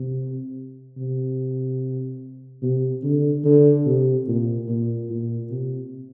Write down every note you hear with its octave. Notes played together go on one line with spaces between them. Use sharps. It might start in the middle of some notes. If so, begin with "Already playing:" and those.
Already playing: C3
C3
C3
D3
D3
C3
A#2
A#2
A#2
C3